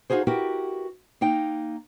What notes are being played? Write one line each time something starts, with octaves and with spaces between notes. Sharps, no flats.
D#4 F4 F#4 G#4 C5
E4 F#4 G4 A#4 B4
A#3 D#4 G5